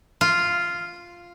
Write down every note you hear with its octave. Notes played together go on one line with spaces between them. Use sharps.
F4